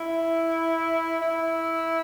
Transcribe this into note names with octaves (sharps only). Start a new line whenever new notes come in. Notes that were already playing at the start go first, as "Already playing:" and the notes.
Already playing: E4
E4